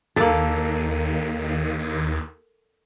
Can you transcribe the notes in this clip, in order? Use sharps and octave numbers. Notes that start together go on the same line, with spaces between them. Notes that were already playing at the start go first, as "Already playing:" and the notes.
D#2 A#3 A4